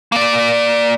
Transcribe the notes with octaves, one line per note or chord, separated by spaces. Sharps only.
A#3 D5